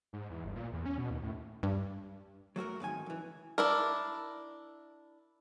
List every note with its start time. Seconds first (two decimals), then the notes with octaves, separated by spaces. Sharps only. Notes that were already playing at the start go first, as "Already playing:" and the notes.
0.13 G#2
0.30 E2
0.45 G1
0.56 A#2
0.73 E2
0.86 C#4
0.98 B2
1.10 D#2
1.22 A2
1.63 G2
2.56 F#3 A3 F#4 A#4
2.80 F2 G#2 D#3 G#5
3.06 F#2 E3
3.58 D4 E4 A#4